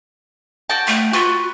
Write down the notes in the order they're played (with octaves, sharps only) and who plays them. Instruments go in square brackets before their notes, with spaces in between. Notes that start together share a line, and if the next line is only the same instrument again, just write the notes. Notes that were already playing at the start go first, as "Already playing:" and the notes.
[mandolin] F#4 G5 A5
[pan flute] A3
[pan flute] F4 [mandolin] F#4 B4